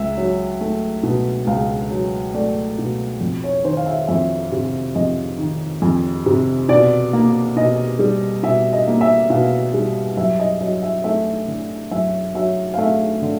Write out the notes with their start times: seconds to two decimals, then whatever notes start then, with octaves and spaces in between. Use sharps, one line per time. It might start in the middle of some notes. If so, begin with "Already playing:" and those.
Already playing: C#2 E5
0.17 F#3
0.61 A3
1.03 B2
1.47 C#2 F5
1.91 F#3
2.34 A3 D5
2.78 B2
3.21 F2
3.44 C#5
3.64 D#3 C5
3.77 F5
3.86 E5
4.08 F2 E5
4.52 C3
4.95 F2 D#5
5.38 D#3
5.82 F2
6.26 C3
6.69 B2 D5
7.13 A#3
7.56 B2 D#5
7.99 G3
8.43 B2 E5
8.73 D#5
8.87 A#3
9.01 E5
9.30 B2 F5
9.74 G3
10.17 F#2 E5
10.39 D#5
10.61 F#3 D#5
10.83 E5
11.04 A3 E5
11.48 D3
11.91 F#2 E5
12.35 F#3 E5
12.74 F5
12.78 A3 E5
13.22 D3